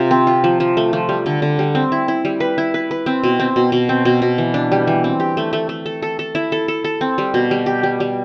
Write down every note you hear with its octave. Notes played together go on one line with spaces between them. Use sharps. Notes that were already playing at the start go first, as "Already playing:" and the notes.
Already playing: C3 F4
C4
F4
F3
F3
A3
F3
G3
D3
D3
G3
C4
E4
E4
G3
B4
E4
B4
B4
C4
B2
C4
B2
B2
C4
B2
B2
E3
D4
G3
E3
C4
G4
A3
A3
A3
A4
A4
A4
E4
A4
A4
A4
C4
G3
B2
G3
G4
G3
G3